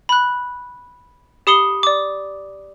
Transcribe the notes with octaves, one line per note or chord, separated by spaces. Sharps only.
B5 F#6
G4 B5 D#6 C7 C#7 G7
D5 D6